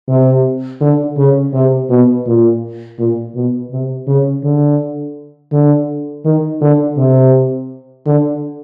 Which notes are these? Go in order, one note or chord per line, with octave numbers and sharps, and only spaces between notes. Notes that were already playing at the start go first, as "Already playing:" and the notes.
C3
D3
C#3
C3
B2
A#2
A#2
B2
C3
C#3
D3
D3
D#3
D3
C3
D3